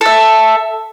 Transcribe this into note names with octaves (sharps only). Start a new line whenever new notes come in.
A4 E5